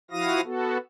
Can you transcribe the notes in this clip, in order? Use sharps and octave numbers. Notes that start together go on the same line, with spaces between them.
F3 E4 F#4 F5 D#6 A#6
B3 F#4 A4